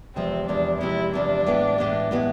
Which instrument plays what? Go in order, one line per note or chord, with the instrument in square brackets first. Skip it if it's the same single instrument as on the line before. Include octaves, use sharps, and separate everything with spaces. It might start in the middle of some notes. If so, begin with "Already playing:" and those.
[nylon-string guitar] E2 C3 F3 G#3 [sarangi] C4
[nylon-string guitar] E2 C3 F3 G#3 [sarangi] D4
[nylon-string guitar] E2 C3 F3 G#3 [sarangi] E4
[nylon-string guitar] E2 C3 F3 G#3 [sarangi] D4
[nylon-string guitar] A2 E3 G#3 B3
A2 E3 G#3 B3
A2 E3 G#3 B3